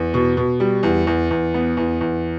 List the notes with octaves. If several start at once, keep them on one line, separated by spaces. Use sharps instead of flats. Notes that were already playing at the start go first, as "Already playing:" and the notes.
Already playing: E2
B2
B2
G3
E2
E2
E2
B3
E2
E2